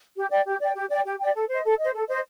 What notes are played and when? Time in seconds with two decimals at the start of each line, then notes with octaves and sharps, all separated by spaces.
0.16 G4
0.31 D5 G5
0.46 G4
0.60 D5 G5
0.75 G4
0.90 D5 G5
1.05 G4
1.19 D5 G5
1.34 A4
1.49 C5 D#5
1.64 A4
1.78 C5 D#5
1.93 A4
2.08 C5 D#5